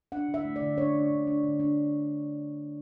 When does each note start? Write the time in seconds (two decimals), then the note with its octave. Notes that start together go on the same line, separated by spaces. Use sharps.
0.12 D4 F#5
0.28 D3
0.34 E5
0.45 A3
0.56 D5
0.62 D3
0.77 D4 C#5
0.94 D4
1.10 D3
1.27 D4
1.43 D3
1.60 D4